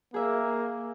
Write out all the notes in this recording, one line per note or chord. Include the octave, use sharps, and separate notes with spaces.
A#3 G#4 E5